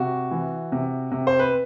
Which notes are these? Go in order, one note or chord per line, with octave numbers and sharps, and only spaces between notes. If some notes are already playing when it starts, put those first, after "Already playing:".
Already playing: C3 F#4
E3
C3
C3
C5
B4